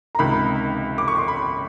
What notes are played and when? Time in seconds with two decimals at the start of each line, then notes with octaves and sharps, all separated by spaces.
0.15 A#5
0.19 C#2 C3 D#3 B5
0.98 D6
1.08 C#6
1.18 C6
1.28 B5